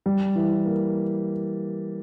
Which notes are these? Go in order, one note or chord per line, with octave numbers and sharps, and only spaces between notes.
G3
E3
A#3